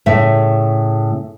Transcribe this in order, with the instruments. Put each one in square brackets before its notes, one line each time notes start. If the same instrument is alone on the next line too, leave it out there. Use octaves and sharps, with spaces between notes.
[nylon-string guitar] A2 C#3 E5